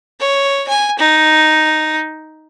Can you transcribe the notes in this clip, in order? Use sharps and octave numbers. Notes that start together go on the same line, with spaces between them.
C#5
G#5
D#4